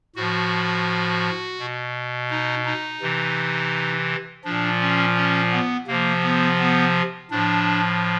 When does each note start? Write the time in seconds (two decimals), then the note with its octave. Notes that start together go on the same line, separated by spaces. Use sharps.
0.15 A2 F3 F#4
1.59 B2
2.30 D#4
2.66 D#4
3.01 C3 E3
4.44 A#2 F3 D4
4.80 C#4
5.16 C#4
5.52 B3
5.87 C3 F3 A#3
6.23 B3
6.60 B3
7.31 A2 F3 D4